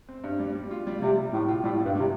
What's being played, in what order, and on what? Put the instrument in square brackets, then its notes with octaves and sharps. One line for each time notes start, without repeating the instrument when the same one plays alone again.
[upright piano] C4
G2
G3
G3
F4
G3
[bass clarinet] C3 [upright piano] G3
[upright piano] G3
[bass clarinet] A2 [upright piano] G3
[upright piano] F4
[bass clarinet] A2 [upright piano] G3
[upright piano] G3
[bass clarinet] G2
[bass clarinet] C3 [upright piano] G3